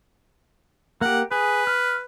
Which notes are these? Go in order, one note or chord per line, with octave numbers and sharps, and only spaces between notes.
A#3 G4 F#5
G#4 B4
F6